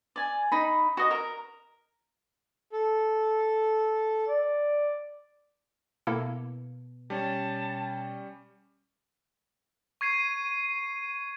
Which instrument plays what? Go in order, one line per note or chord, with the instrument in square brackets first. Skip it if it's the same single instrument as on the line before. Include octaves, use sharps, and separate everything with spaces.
[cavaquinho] D5 G#5
D#4 B5
F#4 D#5
A#4
[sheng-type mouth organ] A4
[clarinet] D5
[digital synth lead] B2 [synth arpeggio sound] A#3 E4 A4
[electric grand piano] G3 C#4 [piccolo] A5
[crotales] C#6 G#6 C7 D#7